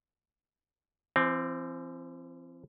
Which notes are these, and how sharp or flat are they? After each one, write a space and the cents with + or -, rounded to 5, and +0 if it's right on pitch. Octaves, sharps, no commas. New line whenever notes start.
E3 +45 C4 +0